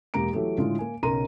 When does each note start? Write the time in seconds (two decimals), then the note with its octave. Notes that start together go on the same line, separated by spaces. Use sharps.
0.14 E1 G#3 A#3 G4 A#5 D7
0.33 E3 F#3 A3 G4 A4
0.58 A2 D3 G#3 F4
0.79 A#3 G#5
1.03 B1 C#3 A#4 A#5 C6 D#7